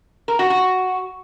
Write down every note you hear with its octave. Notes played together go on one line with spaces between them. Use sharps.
A#4
F#4
F#4